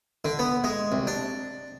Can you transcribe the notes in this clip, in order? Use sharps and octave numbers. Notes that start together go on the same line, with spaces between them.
D3
B3
G#3
C2
D4